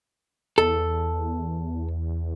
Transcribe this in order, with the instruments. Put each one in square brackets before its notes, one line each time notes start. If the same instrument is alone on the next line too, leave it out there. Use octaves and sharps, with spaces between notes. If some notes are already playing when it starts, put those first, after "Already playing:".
[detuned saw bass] E2 [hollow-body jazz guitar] A4